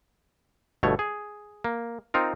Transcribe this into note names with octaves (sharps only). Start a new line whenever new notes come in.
G1 B2 A3 C#5
G#4
A#3
C4 D#4 F4 A#4